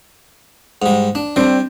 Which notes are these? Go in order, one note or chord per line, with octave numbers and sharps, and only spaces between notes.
G#2 G3
D4
G3 C4 D4